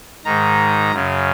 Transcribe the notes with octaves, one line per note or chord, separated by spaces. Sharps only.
G#2 D#3 A#5
F#2 C#3